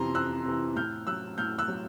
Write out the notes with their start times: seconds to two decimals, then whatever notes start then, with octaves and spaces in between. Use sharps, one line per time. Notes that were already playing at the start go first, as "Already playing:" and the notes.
Already playing: F2 C3 E3 A#5 C6
0.15 F2 E6 F#6
0.46 C3 E3
0.76 A2 F6 G6
1.07 F#3 E6 F#6
1.38 A2 F6 G6
1.59 E6 F#6
1.68 F#3